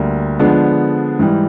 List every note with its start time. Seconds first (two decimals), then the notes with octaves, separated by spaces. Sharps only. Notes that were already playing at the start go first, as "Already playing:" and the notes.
Already playing: D2 D3 G3 A#3
0.39 D3 F3 G#3 B3 D4
1.19 G#2 E3 G3